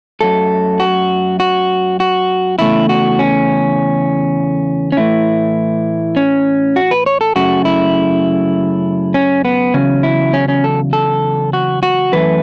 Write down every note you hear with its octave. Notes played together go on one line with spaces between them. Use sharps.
F#2 F#3 A3 A4
F#4
F#4
F#4
E2 C#3 A3 E4
F#4
C#4
C#4
A2 E3 A3 E4
C#4
F#4
B4
C#5
A4
F#2 C#3 A3 F#4
E4
C#4
B3
E2 C#3 F#3 C#4
E4
C#4
C#4
A4
A4
F#4
F#4
F#2 E3 A3 B4